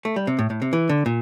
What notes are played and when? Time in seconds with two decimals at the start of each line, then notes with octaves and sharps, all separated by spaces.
0.05 A3
0.16 G3
0.27 C3
0.39 A2
0.50 A2
0.62 C3
0.73 E3
0.89 D3
1.06 A#2